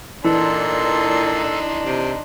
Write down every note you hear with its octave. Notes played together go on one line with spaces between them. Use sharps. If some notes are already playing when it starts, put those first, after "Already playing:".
A#2 E3 D4 D#4 A4 C6
C3